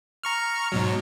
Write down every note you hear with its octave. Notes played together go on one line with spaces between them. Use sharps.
A#5 C#6 F6
G#2 B2 F#3